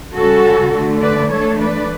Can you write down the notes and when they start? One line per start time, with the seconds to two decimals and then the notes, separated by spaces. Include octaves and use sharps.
0.15 C#3 G3 C#4 F#4 A4
0.73 D3 A3 D4
1.03 B4 D5
1.31 E3 A3 D4 A4 C#5
1.60 B4 D5